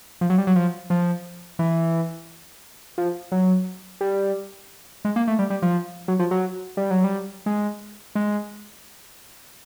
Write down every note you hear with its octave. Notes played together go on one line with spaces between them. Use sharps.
F3
F#3
G3
F#3
F3
F3
E3
F3
F#3
G3
G#3
A#3
A3
G3
G3
F3
F#3
F3
F#3
G3
F#3
G3
G#3
G#3